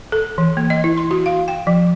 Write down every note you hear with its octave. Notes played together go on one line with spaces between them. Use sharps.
A4
E3
A#3
D#5
E4
C6
F#4
F5
G5
F3